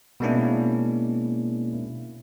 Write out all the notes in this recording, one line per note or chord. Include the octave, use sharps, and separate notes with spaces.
B2 G#3 A#3 C#4 D4 E4